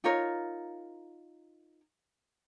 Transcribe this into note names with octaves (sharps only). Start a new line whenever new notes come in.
D#4 F4 A#4 C#5